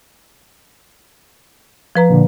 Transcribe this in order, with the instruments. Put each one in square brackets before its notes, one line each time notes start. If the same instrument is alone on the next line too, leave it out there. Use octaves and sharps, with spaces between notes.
[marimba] F3 B4 A#5
[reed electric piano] A#2 D3